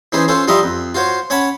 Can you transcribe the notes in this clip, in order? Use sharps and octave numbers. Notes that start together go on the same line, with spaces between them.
E3 C#4 D#4 G#4 C5
C#4 F4 A4 C5
F3 G3 F4 D#5 E5 A#5
F2
F4 F#4 C5 C#5
C#4 C#5 F#5 A5 B5